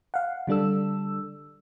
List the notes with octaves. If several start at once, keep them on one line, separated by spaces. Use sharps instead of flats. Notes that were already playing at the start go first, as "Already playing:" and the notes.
F5 F#5
D3 G3 D4 A4 E6